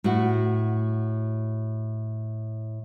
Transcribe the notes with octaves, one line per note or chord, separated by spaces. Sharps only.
A2 F#4